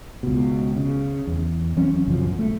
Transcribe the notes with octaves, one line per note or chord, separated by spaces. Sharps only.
C#2 B2
C#3
E2
E3 F#3 C4 C#4
A#1 F#2 C#3 F3
A3